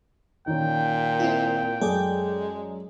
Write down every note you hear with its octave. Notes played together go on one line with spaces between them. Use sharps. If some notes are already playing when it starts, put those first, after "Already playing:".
A#2 D#3 C#4 G5
C4 E4 F4
F#2 G#3 G#4 A4 D5